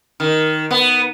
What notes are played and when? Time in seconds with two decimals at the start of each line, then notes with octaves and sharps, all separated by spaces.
0.20 D#3
0.71 B3